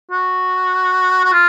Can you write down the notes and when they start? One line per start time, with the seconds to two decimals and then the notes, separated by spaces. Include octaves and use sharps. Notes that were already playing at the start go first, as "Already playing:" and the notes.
0.11 F#4
1.24 F#4
1.32 F4